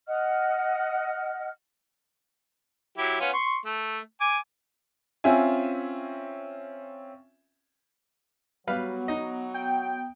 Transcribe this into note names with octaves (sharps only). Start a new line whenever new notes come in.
D#5 F#5 F6
F#3 E4 G4
B3 C#4 F4
C6 C#6
A3
G#5 D6
C4 C#4 F4 E5 G#5
F#3 G3 B3 F#4 B4 F5
D#4 D#5
G5